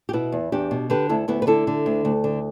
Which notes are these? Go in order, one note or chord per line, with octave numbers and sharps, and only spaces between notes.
G4
B2 B3 E4
E2
E2 D4 G4
B2
D3 G4 B4
D2 E4 A4
D2 B3 E4
B4
D3 E4 A4
D3
D2
D2
D3